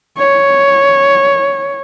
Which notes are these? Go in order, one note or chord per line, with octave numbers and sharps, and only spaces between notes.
C#5